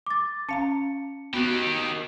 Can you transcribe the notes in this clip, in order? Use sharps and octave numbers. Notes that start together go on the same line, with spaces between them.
D6 A6
C#4 F5 A5 A#5 C#7
D#3 B3 F#4 G4 F#6